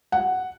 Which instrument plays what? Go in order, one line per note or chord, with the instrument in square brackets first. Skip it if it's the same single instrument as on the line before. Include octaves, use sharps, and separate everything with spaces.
[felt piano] F#5